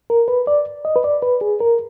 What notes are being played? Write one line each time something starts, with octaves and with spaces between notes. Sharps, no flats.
A#4
B4
D5
D#5
B4
D5
B4
G#4
A#4